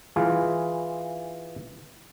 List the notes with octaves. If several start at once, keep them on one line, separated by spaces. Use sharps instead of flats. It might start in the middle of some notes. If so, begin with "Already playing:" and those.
E3 F4 G#4